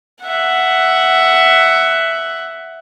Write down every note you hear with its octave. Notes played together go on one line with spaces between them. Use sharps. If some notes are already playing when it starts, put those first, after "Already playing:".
E5 F#5